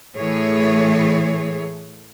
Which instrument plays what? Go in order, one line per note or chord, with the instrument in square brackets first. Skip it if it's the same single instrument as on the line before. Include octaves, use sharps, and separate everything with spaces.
[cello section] A2 E3 A3 G#4 C#5